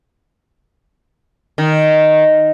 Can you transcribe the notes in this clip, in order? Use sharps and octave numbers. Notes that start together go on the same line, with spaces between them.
D#3